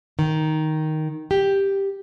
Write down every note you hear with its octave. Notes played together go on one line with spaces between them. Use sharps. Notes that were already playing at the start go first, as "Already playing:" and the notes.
D#3
G4